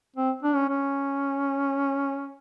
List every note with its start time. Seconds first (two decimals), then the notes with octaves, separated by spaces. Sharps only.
0.16 C4
0.43 D4
0.55 C#4
0.69 C#4